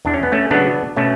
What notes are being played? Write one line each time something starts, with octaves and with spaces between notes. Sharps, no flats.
E2 D4
C#4
B3
A3 C#4
C#3 F#3 B3 D4
B2 A3 C#4